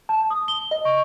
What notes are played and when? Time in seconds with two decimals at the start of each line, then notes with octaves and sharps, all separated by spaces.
0.09 A5
0.30 D#6
0.48 G7
0.71 D#5
0.85 C#6